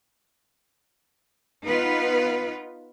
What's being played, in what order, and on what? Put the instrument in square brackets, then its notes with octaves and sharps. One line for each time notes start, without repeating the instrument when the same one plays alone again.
[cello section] B3 D#4 F4 B4